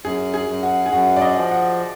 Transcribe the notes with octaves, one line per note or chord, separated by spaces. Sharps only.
F#2 G#4
G#4
F#2
F#4
G#4
F#2 F#4
D5
D#5
F3
F#5